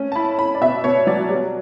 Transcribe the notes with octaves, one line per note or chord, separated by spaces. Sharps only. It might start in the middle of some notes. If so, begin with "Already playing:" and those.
Already playing: A3 C#4
A5
E4 B5
E4 B5
D5
B2 E5
B2 C#5
F#3 D5
G3